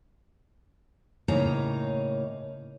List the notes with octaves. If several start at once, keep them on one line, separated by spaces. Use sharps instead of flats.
A2 C#3 A#3 D#4 C#5 A#5